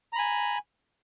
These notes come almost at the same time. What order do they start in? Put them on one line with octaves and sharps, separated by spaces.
A#5 B5 G#5